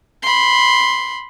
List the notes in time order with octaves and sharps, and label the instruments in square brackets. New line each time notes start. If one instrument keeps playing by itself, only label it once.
[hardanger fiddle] B5 C6